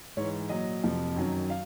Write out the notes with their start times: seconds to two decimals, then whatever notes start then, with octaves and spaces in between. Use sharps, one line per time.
0.17 G#2 E3 C#5
0.49 A#2 F#3 D#5
0.83 F2 C3 F3
1.16 F#2 D#3 F#3
1.50 F5